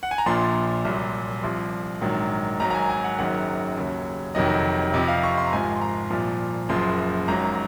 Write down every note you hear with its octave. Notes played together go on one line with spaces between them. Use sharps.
F#5
G#5
A#5
A#1 A#2 F3 C6
C2 A#2 F#3
C2 C3 F3 C6
A#1 G#2 D#3 F#3
G#1 G#2 F#3 A#5
A#5
G#5
G#5
F#5
F#1 F#2 D#3 F#3 F#5
D#2 C#3 F#3
F1 F2 C3 D#3 F#3 D#5
F2 C3 F3 D#5
F5
C#6
C6
A#5
G#1 G#2 F3 G#5
C6
A#5
C2 A#2 F3
F#1 F#2 F3 C6
G#1 G#2 F#3 A#5